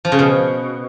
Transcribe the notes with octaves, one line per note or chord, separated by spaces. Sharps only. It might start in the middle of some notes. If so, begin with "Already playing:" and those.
F3
C#3
B2